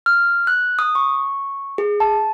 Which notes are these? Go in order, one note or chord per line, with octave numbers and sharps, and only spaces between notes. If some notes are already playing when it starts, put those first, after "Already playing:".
F6
F#6
D#6
C#6
G#4
A5